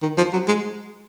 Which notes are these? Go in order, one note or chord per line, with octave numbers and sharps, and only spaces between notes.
D#3
F3
F#3
G#3